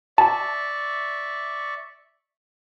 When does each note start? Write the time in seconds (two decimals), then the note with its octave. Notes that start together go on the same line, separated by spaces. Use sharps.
0.18 D5 E5 A5 C#6